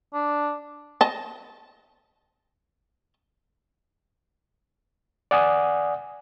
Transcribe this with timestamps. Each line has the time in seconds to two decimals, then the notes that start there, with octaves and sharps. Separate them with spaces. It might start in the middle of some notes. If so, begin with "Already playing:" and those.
0.13 D4
1.01 D#5 A5
5.31 D5 F#5 G#5 D#6